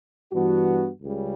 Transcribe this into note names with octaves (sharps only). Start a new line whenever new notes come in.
G2 E3 B3 D4 F#4
C#2 C#3 G3